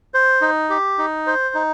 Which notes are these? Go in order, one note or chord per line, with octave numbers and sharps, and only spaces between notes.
C5
D#4
G4
D#4
C5
D#4